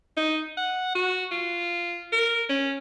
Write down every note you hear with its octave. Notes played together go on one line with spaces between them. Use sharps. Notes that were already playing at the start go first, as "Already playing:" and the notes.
D#4
F#5
F#4
F4
A#4
C#4